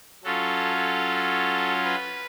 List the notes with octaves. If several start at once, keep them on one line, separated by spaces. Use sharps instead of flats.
F#3 C#4 F4 A4
A4
B4